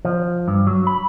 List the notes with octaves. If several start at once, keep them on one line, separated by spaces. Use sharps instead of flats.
F3
G2
F#3
B5